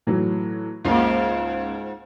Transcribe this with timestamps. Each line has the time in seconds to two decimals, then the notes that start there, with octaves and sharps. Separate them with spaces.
0.07 A2 E3 F#3
0.84 C#2 G#2 A#3 F4